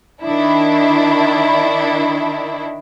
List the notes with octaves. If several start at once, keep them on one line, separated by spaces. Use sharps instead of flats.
D#3 D4 E4